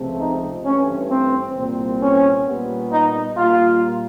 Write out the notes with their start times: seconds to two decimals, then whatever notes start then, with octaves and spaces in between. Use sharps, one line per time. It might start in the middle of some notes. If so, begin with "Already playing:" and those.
Already playing: C#2 C3 F3 A3 C4
0.20 D#4
0.65 G2 E3 A3 C4 C#4
1.11 C4
1.56 C2 A#2 G3 C4
2.01 C#4
2.46 A#2 G3 B3
2.92 D#4
3.37 A#2 G3 A#3 F4